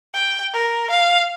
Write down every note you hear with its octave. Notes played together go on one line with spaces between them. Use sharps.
G5
A#4
F5